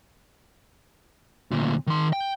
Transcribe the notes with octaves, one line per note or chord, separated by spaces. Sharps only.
D2 A#2
D#3 C6
G5